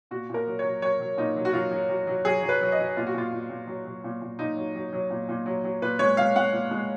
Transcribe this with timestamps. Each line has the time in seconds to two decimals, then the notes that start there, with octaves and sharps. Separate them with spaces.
0.11 A#2 F#4
0.30 A#2 A#4
0.47 F#3
0.59 C#5
0.65 F#3
0.82 F#3 C#5
1.00 F#3
1.18 A#2 D#4
1.36 F#3
1.45 F#4
1.53 F#3 F4
1.71 F#3
1.90 F#3
2.07 F#3
2.25 F#3 G#4
2.43 F#3
2.49 B4
2.61 F#3
2.72 D#5
2.79 F#3
2.97 A#2 F4
3.07 F#4
3.14 A#2 F4
3.32 A#2
3.50 A#2
3.67 F#3
3.85 F#3
4.04 A#2
4.22 A#2
4.39 A#2 D#4
4.56 F#3
4.76 F#3
4.93 F#3
5.10 A#2
5.29 A#2
5.46 F#3
5.64 F#3
5.82 A#2 B4
5.99 G#3 C#5
6.17 G#3 F5
6.36 G#3 F#5
6.53 A#2
6.71 G#3